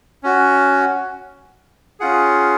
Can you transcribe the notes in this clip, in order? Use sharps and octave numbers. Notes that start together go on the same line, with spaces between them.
C#4 F#4
C#4 F4 G#4 F#5